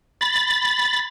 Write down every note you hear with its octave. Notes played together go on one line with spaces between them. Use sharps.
B5 A6